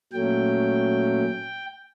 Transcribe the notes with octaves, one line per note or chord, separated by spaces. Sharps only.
A#2 F#3 A3 C#4 G5